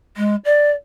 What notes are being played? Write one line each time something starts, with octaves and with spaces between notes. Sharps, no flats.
G#3
D5